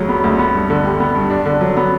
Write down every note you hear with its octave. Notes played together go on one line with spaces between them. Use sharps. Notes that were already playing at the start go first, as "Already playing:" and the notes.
Already playing: D2 C#3 F#3
B3
D2
B3
G2
D3
G3
B3
G2
D4
D3
F#3
B3